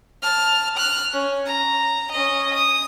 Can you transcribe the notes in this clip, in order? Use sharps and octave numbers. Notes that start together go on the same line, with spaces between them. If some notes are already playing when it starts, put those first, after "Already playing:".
A5 F6
F6 F#6
C#4
A#5
C#4 D#5
D#6